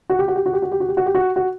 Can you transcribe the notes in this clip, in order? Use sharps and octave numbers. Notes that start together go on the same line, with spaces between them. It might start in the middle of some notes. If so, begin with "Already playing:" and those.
F#4
G4
F#4
G4
F#4
G4
F#4
G4
F#4
G4
F#4
G4
F#4
F#4